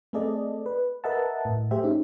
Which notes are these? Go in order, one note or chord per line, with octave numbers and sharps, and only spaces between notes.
A3 C4 G#4 A4 D5 D#5
B4
A#4 B4 D#5 E5 F#5 A5
A2
A3 G4 G#4 C5 E5
C#4 D#4